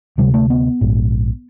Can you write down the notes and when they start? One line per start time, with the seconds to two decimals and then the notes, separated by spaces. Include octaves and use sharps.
0.18 D2 C3 G3
0.34 A3
0.50 B3
0.81 A#1 G#2